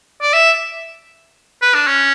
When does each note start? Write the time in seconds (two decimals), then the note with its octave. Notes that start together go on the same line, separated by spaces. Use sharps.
0.22 D5
0.33 E5
1.62 B4
1.74 D4
1.87 C#4